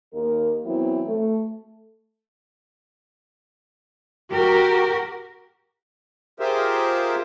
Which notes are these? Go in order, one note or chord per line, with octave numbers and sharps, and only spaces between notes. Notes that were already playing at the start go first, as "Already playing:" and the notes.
D#2 A#3 D#4 A#4
E3 F#3 B3 C4 E4
A3
F#4 G4 A#4
F4 G4 G#4 A#4 C5 E5